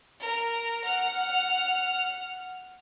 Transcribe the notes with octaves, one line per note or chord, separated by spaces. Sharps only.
A#4
F#5 F6